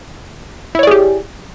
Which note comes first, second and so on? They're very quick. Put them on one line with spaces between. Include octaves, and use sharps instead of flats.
E4 C#5 D5 G#4 G4